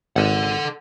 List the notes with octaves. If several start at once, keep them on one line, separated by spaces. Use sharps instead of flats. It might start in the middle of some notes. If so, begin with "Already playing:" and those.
G#1 A4 F#5